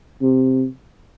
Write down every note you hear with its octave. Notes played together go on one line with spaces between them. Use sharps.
C3